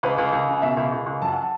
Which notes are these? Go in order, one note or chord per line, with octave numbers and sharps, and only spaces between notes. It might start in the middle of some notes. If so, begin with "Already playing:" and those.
C#2 B4
C#2
C#2
C#3
B2 E5
C#2
C#2
C#2
F#2 A5
F#5
A5